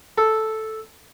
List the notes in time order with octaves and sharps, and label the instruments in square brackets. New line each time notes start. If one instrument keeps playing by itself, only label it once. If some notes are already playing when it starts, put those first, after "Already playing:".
[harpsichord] A4